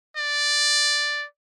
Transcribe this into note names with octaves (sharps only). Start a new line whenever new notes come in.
D5